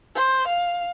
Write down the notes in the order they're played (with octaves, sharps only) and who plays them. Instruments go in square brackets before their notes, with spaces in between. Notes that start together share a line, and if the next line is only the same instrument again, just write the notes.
[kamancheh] C5
F5